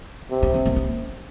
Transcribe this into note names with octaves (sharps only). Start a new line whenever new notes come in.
C3
C#4
C4
A#3
C#4